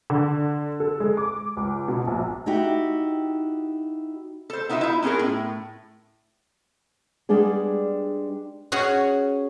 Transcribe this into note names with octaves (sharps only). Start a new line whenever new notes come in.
D3
A4
G#3
D6
C#2
B2
A#1
D#4 E4 F#4 G4
A4 C5
B3 D#4 F4 F#4 E5
D#4 E4
B3 C#4 F4 G#4 A#4
A2
G3 G#3 B3 D4 G#4
C#4 F#4 G#4